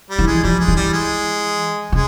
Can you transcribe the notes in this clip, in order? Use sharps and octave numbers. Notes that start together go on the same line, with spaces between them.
G3
E3
G#3
F3 G3
G#3
E3
G3
G#3
C#3 G#3